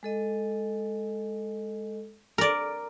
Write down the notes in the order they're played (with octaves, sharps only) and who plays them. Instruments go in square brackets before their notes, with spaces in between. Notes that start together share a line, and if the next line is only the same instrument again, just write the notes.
[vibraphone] G#3 A4 D#5
[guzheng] A#4 D5 [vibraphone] A#5